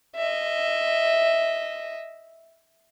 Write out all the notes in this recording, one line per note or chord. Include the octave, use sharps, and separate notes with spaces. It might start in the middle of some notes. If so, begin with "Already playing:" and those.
D#5 E5